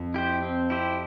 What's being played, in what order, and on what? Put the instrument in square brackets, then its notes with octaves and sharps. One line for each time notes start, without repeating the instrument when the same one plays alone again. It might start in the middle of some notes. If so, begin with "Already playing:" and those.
Already playing: [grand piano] F2
[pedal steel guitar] E4 G4 C5
C4
E4 G4 C5